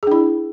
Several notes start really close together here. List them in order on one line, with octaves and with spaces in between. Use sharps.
G#4 D4 E4